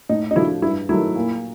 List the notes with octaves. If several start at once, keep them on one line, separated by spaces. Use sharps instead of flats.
A2 D#4
D#4
F3 A3 D4 E4 F#4
G2 E4
D#3 F#3 A3 E4
A#2